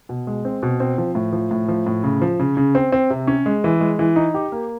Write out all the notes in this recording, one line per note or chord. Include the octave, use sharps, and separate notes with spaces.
B2
G#3
C4
B2
C4
F3
A2
F3
A2
F3
A2
C#3
F3
C#3
C#3
C4
C4
C3
C#4
G#3
E3
G#3
E3
D#4
G4
A#3